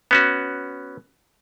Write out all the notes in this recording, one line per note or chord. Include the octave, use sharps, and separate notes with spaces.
B3 C#4 F#4